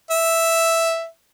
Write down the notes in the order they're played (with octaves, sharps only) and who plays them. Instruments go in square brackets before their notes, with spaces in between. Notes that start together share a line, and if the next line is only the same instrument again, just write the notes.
[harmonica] E5